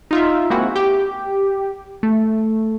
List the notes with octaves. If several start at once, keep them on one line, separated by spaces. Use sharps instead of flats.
D#4 F4 E5
G#3 A#3 C4 E4 F#4
G4
A3